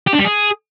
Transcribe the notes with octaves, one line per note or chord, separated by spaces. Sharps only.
G4
D4
G3
G#4